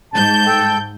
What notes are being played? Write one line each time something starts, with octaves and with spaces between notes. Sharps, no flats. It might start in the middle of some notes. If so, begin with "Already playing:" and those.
G#2 A5 G6
A4 G5